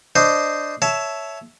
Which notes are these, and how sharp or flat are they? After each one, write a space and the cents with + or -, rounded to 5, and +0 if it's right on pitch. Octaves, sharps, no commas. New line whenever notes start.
D4 +0 C5 -10 D#5 +0
C#5 +10 E5 +0 A5 -10